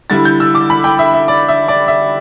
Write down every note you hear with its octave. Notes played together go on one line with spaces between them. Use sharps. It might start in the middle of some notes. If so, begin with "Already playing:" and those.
D3 G3 E4 A6
G6
E6
D6
B5
G5
E5
E5
D5
E5
D5
E5